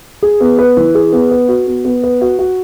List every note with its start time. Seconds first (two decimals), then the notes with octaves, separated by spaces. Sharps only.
0.23 G#4
0.41 B3
0.59 B4
0.77 E3
0.95 G#4
1.13 B3
1.31 B4
1.48 F#4
1.67 B3
1.85 B3
2.03 B4
2.21 F#4
2.39 F#4